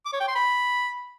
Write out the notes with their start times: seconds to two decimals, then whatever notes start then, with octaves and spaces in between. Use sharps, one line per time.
0.05 D6
0.13 C#5
0.20 G5
0.28 C6
0.35 B5